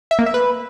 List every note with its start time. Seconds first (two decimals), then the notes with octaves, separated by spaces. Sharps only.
0.11 E5
0.19 A#3
0.26 E5
0.34 B4